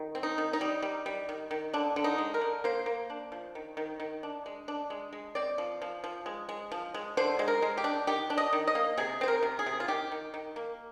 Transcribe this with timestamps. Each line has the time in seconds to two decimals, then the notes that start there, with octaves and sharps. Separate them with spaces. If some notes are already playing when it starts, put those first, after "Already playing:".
Already playing: D#3
0.15 C4
0.23 D#4
0.38 D#3
0.53 D#4
0.61 G3
0.82 G3
1.06 G3
1.29 D#3
1.51 D#3
1.74 D3 D4
1.96 D3
2.04 D#4
2.18 G#3
2.34 A#4
2.41 D3
2.64 A#3 C5
2.86 A#3
3.10 D4
3.32 F3
3.55 D#3
3.77 D#3
4.00 D#3
4.23 D4
4.46 G#3
4.68 D4
4.90 G#3
5.13 G#3
5.35 C4 D5
5.58 F3
5.82 F3
6.04 F3
6.26 G#3
6.49 G#3
6.72 F3
6.94 G#3
7.17 D3 C5
7.39 G#3
7.48 A#4
7.62 G#3
7.78 G4
7.84 D4
8.07 D#3 G4
8.30 D4
8.38 D#5
8.53 D#3
8.67 D#5
8.75 A#3
8.97 C3 G#4
9.21 C4 C5
9.28 A#4
9.43 C3
9.59 G#4
9.66 C3
9.80 F4
9.88 D#3 G4
10.12 D#3
10.34 D#3
10.56 A#3